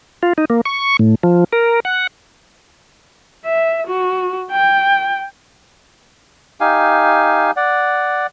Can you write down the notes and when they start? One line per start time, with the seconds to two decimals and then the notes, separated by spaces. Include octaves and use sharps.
0.23 F4
0.38 D#4
0.50 A#3
0.65 C#6
0.99 A2
1.23 F3
1.53 A#4
1.85 F#5
3.45 E5
3.88 F#4
4.52 G5
6.60 D#4 G4 F5 G#5
7.56 D5 F#5